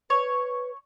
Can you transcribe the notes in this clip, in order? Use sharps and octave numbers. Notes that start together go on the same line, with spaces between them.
B4 C#5